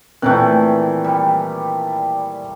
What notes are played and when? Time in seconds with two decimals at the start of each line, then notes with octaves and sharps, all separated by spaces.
0.22 A#2 D#3 E3 A3 C4 F#6
1.04 G3